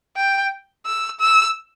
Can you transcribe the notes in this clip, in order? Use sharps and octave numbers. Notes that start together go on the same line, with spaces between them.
G5
E6
E6